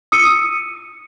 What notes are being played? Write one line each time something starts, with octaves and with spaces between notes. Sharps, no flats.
D#6 E6 C#7 D#7